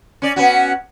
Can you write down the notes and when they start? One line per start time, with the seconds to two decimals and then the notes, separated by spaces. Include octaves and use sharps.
0.22 C#4 D5
0.36 B3 C#4 F#4